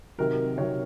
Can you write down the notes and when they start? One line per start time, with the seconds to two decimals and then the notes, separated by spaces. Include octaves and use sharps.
0.18 C3 D#3 F#3 A#4
0.58 C3 D#3 F#3 C#5